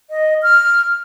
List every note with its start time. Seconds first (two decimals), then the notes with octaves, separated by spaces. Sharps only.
0.10 D#5
0.42 F6